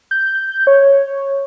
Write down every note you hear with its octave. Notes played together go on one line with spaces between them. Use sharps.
G6
C#5